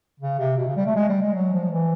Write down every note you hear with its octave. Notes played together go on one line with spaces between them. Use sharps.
C#3
C3
B2
C#3
G3
A3
G#3
G3
G#3
F#3
F3
E3